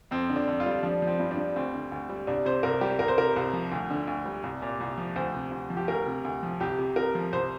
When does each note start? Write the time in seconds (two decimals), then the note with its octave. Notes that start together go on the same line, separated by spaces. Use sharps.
0.11 F2 C4
0.30 D3
0.36 D4
0.47 F2
0.60 F4
0.66 G3
0.83 F3 D4
1.02 F3
1.07 C4
1.20 G2
1.31 D4
1.38 G2
1.56 D2 C4
1.74 D3
1.92 D2
2.10 G3
2.27 C2 D4
2.46 C3 C5
2.63 C2 A#4
2.81 G3 G4
2.99 C2 A#4
3.08 C5
3.18 C3 A#4
3.36 C2
3.53 F3
3.72 D2
3.90 D3
4.08 D2
4.26 G3
4.43 C2
4.62 A#2
4.80 C2
4.98 F3
5.16 D2 C5
5.34 C3
5.52 D2
5.70 F3
5.77 G4
5.88 D2 A#4
6.06 C3
6.25 D2
6.43 F3
6.60 C2 G4
6.79 C3
6.96 C2 A#4
7.15 F3
7.33 C2 C5